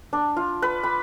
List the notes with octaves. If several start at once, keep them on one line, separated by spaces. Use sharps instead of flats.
D4
F4
B4
B5